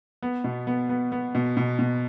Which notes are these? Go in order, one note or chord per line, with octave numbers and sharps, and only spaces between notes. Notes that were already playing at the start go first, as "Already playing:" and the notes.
B3
B2
B3
B3
B3
B2
B2
B2